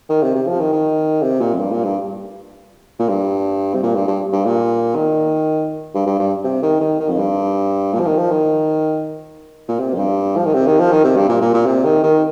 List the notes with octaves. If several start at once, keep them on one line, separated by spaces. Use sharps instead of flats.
D#3
C3
C3
F3
D#3
D#3
C3
A#2
F2
G2
A#2
G2
A#2
G2
C3
A#2
G2
G2
G2
A#2
D#3
G2
G2
G2
C3
D#3
D#3
D#3
F2
G2
A#2
F3
D#3
F3
D#3
A#2
C3
F2
G2
F3
D#3
C3
D#3
F3
D#3
C3
G2
A#2
A#2
A#2
C3
D#3
D#3